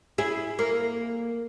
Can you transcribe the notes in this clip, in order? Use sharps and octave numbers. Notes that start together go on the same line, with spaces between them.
E4 G#4
A#3